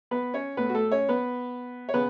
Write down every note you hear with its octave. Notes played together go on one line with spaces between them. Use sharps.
B3 B4
C#4 C#5
A2 A3 B3 B4
F#4
A3 A4
C#4 C#5
B3 B4
C#5
C#3 B3 B4